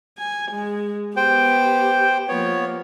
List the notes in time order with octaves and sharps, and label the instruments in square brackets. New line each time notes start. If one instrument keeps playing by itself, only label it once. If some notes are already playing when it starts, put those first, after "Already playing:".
[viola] G#5
G#3
[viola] B3 G4 [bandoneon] C5 G5
[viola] F3 A#3 [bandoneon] B3 C#5